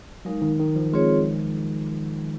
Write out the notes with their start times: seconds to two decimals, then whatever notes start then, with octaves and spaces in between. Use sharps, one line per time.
0.25 F#3 G#3 D#4 A#4 F5
0.42 D#3
0.59 D#3
0.76 F3
0.93 G#3 C4 F4 G#4 C#5